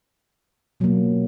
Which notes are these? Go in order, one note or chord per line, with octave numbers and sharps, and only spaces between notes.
B2 F#3 A#3